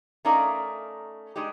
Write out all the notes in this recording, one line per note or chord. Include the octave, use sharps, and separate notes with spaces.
A3 C#4 D#4 A#4 D5 F5
G#3 D4 D#4 G4